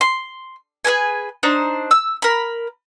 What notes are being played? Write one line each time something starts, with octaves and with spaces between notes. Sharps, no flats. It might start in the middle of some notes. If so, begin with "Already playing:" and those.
C6
G#4 A#4 B4 G#5
D4 D#4 C5
E6
A#4 B5